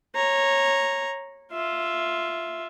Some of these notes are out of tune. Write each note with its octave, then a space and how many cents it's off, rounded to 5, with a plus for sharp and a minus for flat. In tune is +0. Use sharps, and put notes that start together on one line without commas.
C#5 -15 A#5 -5
F4 +0 E5 +0